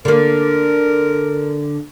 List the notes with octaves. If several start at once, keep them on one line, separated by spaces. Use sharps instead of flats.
D3 A#3 A#4